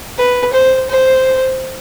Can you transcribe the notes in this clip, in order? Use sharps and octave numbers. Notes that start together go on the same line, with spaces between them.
B4
C5
C5